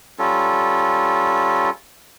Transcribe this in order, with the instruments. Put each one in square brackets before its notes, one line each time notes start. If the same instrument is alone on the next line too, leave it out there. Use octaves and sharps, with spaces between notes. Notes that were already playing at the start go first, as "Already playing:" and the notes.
[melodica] G3 C#4 F4 A4